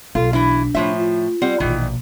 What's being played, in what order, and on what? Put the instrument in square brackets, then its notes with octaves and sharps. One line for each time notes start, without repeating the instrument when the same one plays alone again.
[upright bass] B1 [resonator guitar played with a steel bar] F4 [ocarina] A4
[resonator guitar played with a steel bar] E3 E4 [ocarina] D4
[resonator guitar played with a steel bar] A2 F3 E5 [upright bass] A3
[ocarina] F4
[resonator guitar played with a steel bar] G3 C4 F#5
[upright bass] A#1 B2 [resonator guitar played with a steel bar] D#3 E3